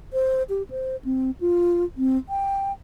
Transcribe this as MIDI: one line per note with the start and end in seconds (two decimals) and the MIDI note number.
0.13 0.43 72
0.49 0.63 67
0.70 0.96 72
1.05 1.31 60
1.41 1.85 65
1.97 2.17 60
2.29 2.72 79